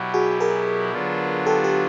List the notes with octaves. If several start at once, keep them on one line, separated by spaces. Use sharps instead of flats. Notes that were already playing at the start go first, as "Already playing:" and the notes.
Already playing: B2 F#3 B3 E4 G4
F#4 G#4
G#4 A#4
D3 F#3 B3 D4 F4
G4 A4
G4 A4